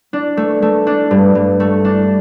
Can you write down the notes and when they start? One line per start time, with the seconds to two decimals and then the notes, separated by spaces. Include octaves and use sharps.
0.13 D4
0.37 A3
0.62 A3
0.87 D4
1.11 G2
1.35 G2
1.60 A3
1.85 D4